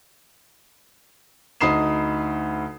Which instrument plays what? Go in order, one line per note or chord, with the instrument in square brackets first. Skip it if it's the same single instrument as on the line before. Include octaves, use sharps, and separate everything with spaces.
[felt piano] D2 D#4 B5 D#6 C7 E7